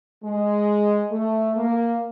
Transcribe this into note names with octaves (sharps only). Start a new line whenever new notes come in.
G#3
A3
A#3